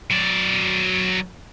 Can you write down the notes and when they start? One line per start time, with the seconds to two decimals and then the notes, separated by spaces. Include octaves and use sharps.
0.11 F#3 D5